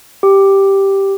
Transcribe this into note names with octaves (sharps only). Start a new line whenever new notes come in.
G4